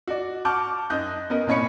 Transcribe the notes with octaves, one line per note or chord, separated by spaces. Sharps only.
F#4 D5
F#5 A5 C#6 D6 F6 G6
F#2 D#4 D#5 F#6 G6
B3 C#4 A#4 D#5
C2 A#2 C#4 C#5 B5 C#7